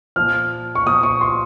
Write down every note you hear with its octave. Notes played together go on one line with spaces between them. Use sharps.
A#2 F3 F6
C#6
A#2 F3 D#6
C#6
C6